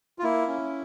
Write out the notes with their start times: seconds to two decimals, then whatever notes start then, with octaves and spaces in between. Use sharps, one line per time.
0.19 F4
0.23 A#3 E4
0.48 C#4